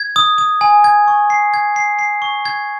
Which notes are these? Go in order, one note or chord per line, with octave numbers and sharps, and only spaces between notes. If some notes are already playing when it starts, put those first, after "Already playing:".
Already playing: G#6
D#6
D#6
G#5
G#6
C#6
C7
G#6
C7
C7
C#6
G#6